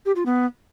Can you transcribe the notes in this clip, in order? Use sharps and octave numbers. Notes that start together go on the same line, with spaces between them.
G4
F4
B3